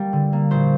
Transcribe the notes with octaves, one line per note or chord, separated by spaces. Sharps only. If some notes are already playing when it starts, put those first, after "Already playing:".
Already playing: G3 A#3
D3
A#3
A#1 C5